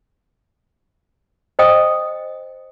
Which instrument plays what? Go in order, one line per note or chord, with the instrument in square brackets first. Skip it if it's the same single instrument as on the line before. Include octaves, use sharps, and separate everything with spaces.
[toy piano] C5 D#5 G5 D#6